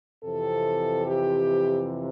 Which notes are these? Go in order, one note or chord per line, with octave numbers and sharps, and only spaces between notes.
F2 C3 E3 A4
G4